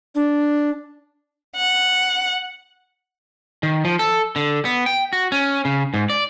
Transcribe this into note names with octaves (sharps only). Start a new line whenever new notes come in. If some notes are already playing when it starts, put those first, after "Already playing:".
D4
F#5
D#3
F3
A4
D3
B3
G5
F#4
C#4
C#3
G#2
D5